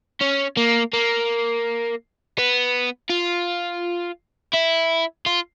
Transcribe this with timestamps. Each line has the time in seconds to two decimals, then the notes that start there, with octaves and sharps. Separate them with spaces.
0.21 C#4
0.57 A#3
0.93 A#3
2.38 B3
3.09 F4
4.54 E4
5.26 F4